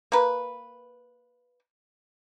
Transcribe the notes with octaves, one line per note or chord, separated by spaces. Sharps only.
A#3 B4